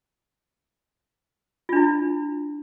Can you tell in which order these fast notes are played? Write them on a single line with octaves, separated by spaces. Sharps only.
F4 D4 E4